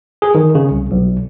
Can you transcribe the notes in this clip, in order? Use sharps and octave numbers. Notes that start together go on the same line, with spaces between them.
G#4
D#3
C#3
C2
B1